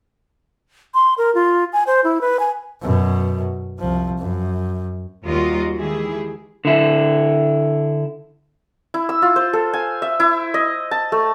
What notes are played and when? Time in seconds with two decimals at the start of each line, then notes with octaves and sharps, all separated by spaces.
0.94 C6
1.18 A#4
1.35 F4
1.73 G#5
1.87 C5
2.04 E4
2.21 B4
2.40 G#5
2.81 F#2 B2
3.79 C2 F3
4.18 F#2
5.24 D#2 G3 F4 F#4 A#4 D#5
5.75 D#3 E3 G#3 E4 G4 G#4
6.65 D3 E4
8.94 E4
9.09 E6
9.22 F4
9.36 C5
9.53 A4
9.73 G#5
10.02 E5
10.20 E4
10.54 D#5
10.91 A5
11.12 A3